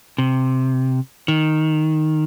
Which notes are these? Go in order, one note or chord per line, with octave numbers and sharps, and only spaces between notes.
C3
D#3